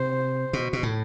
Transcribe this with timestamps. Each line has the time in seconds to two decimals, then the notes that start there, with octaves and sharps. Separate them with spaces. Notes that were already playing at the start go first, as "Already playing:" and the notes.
Already playing: C3 C5
0.53 B2
0.73 B2
0.83 A2